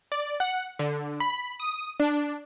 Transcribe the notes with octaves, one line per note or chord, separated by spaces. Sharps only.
D5
F#5
D3
B5
D#6
D4